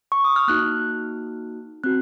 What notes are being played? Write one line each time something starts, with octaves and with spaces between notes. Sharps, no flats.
C#6
D#6
F6
A#3 D#4 F#4 F#6
C4 F#4 F#6